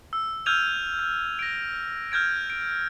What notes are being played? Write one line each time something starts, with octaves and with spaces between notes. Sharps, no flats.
E6
E6 F6 G6 G#6 D#7 F7
G6
A#6 D7
F6 G6 G#6 D7
D7